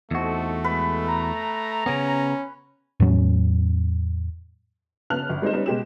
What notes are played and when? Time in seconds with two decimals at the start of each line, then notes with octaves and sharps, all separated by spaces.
0.11 E2 A3 C4 D#4 F#4 A4
0.64 G#3 A4 B4
1.08 A#5
1.86 C#3 B3 C#4
3.00 E2 A2 F#3 C#4
5.10 C#3 B3 A5 F6 F#6 F7
5.29 G1
5.42 G3 G#3 C4 D#4 C5
5.53 G3 B3 C#4 D#4
5.66 B2 G#3 G4 E7